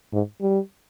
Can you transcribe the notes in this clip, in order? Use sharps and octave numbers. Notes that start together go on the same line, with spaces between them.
G#2
G3